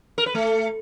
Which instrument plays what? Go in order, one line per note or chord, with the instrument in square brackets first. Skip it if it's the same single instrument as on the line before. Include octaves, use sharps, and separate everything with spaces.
[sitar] A#4
B4
A3